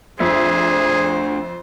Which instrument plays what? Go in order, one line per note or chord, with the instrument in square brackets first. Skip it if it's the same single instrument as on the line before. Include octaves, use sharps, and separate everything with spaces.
[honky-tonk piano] F2 E5 [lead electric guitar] A3 D4 [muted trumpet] G#4 [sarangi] C5